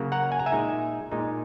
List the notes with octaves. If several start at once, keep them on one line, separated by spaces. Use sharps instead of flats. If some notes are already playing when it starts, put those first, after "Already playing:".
Already playing: C#3 F#3 A#3
F#5 A#5
G#5
A#5
E5 G#5
A#2 G#3 D#4
A#2 G#3 D#4